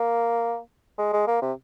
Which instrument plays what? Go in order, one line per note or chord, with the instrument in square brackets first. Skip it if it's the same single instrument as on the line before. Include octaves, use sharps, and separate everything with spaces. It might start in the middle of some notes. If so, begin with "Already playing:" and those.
Already playing: [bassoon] A#3
G#3
G#3
A#3
C3